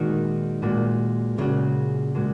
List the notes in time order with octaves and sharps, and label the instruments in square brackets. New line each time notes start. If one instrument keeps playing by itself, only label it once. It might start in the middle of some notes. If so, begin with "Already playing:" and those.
Already playing: [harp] A#2 G#3 F#4 [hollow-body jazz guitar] D#3
[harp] A#2 G#3 F#4
[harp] A#2 G#3 F#4 [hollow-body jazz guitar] C#3
[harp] A#2 G#3 F#4